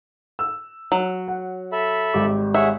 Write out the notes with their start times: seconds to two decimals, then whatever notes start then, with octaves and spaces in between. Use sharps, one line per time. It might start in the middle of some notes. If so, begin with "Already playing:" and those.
0.39 E6
0.92 F#3
1.28 F#5
1.72 A4 E5 B5
2.14 G#1 G3 D6
2.54 G#4 C#5 E5 F#5